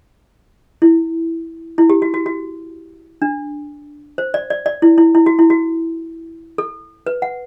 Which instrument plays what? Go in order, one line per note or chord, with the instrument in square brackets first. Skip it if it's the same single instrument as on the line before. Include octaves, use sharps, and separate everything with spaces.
[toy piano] E4
E4
G4
F#4
F#4
F#4
D4
C5
D5
D5
D5
E4
E4
E4
F#4
E4
F#4
A4
B4
F#5